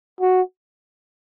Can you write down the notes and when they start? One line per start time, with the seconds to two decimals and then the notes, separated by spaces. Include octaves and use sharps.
0.21 F#4